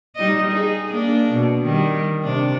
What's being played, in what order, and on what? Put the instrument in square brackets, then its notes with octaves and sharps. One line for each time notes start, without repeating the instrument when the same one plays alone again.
[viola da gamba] G3 D#4 D#5
D#4 G#4
A#3 D4
B2
D#3 G3
C3 D4